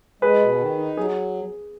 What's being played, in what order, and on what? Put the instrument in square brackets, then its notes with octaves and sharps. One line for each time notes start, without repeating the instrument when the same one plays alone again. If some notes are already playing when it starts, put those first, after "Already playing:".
[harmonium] G#3 [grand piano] G#4 B4
[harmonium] B2
D#3
D#4
[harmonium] F#3 [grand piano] G#4